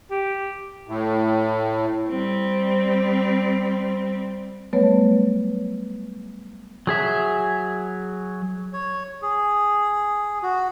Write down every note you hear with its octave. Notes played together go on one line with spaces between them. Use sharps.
G4
A2
G3 C4
F#3 G3 A3 B3 B4 C#5
F#3 G#4 E5
C#5
G#4
F#4